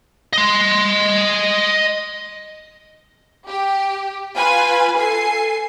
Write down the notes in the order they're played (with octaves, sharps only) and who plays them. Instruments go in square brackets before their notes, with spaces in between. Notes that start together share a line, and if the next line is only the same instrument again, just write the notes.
[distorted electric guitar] D#5 C6
[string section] G4
F4 B4 G#5
A4 G#5 C7